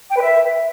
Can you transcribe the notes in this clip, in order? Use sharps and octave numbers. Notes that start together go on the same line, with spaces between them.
G5
B4
E5